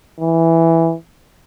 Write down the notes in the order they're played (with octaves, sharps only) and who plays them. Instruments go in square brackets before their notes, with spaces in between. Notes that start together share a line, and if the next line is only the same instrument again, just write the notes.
[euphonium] E3